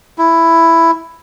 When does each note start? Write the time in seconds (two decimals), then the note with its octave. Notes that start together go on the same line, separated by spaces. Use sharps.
0.18 E4